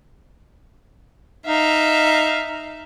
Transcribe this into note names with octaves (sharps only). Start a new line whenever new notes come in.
D#4 E5 F5